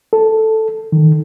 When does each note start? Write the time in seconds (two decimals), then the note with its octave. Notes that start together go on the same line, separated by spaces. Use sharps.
0.13 A4
0.92 D#3